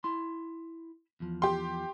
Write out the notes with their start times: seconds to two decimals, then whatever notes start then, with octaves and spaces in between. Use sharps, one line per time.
0.04 E4 C6
1.20 E2 F3
1.42 G4 C6